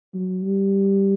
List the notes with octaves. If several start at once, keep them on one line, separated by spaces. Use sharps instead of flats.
F#3
G3